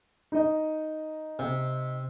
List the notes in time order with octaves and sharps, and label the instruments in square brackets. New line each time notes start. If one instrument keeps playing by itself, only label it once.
[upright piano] D#4 D#5
[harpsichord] C3